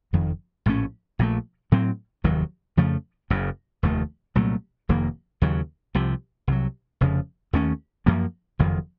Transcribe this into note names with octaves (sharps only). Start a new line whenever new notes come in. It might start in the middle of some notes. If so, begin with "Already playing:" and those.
F#1 F2 D#3
A#1 A2 A3 C#4
A#1 A#2 F3 A3
A2 F#3 C4
F1 D#2 D#3 F#3
F2 C#3 F3 A3
F#1 F#2 C#3
F1 D#2 D#3 A3
C2 A#2 F#3 A3
F1 F2 D#3 A#3
D#2 C#3 F#3
C2 C3 F3
C2 C3 F#3
F1 F2 C#3 F3
D#2 D#3 A3 C#4
F#2 F3 A#3
F#1 F2 D#3